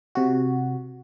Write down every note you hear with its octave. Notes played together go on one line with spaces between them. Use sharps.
C3 F#4